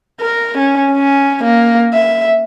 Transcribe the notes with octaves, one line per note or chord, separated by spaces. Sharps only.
A#4
C#4
C#4
A#3
E5